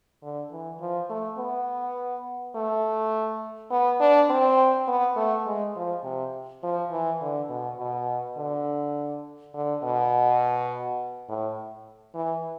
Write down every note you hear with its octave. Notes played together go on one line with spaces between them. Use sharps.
D3
E3
F3
A3
B3
A3
B3
D4
C4
B3
A3
G#3
F3
C3
F3
E3
D3
B2
B2
D3
D3
B2
A2
E3